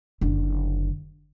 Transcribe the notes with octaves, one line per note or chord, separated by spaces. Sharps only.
F#1 D3